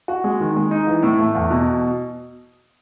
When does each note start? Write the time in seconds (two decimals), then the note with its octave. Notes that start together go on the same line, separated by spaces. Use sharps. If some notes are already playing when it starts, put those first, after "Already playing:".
0.08 F#4
0.24 G#3
0.40 D#3
0.56 G#3
0.71 D#4
0.87 E3
1.03 A2
1.18 A3
1.35 E2
1.50 B2